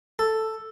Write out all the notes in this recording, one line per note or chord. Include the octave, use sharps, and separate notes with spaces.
A4